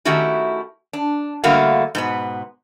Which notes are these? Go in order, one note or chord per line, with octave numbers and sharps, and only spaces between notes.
D#3 A3 C#4 E4 F#4 G4
D4
D3 G3 A3 A#3 F#4 F5
G#2 B2 B3